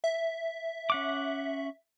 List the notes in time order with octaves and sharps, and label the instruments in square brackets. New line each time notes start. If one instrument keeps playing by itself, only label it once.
[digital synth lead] E5
[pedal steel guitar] C#4 F#5 D6